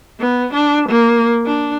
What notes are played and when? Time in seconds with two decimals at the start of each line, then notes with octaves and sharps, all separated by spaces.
0.20 B3
0.54 D4
0.89 A#3
1.45 D4